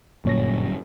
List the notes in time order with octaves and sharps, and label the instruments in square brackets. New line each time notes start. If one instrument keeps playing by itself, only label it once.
[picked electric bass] G1 F#2 [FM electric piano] A#2 C#5 A#6